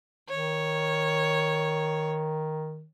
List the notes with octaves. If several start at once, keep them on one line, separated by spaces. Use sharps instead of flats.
D#3 C#5